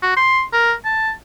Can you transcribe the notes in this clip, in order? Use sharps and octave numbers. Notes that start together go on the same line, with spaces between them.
F#4
C6
A#4
A5